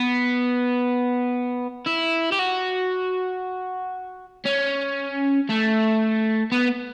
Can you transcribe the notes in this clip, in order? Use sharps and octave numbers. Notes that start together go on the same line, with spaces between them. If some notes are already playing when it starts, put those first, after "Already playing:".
Already playing: B3
E4
G4
F#4
C#4
A3
B3